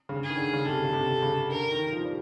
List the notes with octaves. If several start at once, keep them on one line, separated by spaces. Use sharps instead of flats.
C#3
G#4
D#3
D3
C#3
C3 A4
C#3
C3
C#3
D3 A#4
D#3
F3
G3